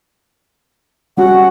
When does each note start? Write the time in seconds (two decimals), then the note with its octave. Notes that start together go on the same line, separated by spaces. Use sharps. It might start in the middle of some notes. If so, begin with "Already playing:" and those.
1.17 G3 C#4 F#4 F#5